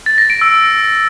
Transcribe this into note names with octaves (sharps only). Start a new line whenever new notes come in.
A6
A#6
D7
E6